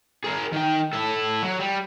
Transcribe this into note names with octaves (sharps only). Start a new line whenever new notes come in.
G#4 A#4
D#3 G5
E4 A4
F#3
G3